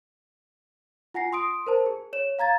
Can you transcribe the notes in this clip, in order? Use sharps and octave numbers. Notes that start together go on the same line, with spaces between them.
F4 F#5 G#5 A#6 C7
C6 D#6 D7
A#4 C5 A5
G#4
C#5 E7
F5 A#5 G#6 A6